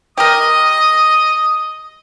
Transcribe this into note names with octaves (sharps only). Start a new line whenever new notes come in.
G4 A#4 D#5 D#6